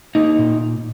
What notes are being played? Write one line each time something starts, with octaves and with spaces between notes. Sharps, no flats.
A#3 D#4
A#2